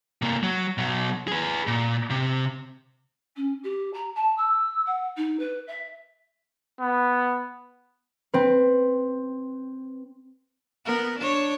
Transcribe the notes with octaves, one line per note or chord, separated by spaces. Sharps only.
C3 A#3
F#3
B2 F#3
G#4 B4
A#2
C3
C#4
G4
A#5
A5
E6
F#5
D#4
B4
E5
B3
C4 B4
B3 A#4
D4 C#5